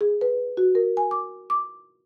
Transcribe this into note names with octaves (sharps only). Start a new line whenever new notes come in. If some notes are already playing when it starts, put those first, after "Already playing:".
G#4
B4
F#4
A#4
G#5
D6
D6